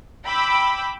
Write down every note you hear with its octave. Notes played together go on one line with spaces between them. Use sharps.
G5 B5 D6 E6